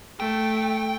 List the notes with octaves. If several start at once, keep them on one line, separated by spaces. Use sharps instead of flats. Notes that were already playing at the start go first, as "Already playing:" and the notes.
A3 G5